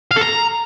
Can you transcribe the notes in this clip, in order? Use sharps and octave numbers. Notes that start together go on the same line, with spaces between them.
F5
A4
A#5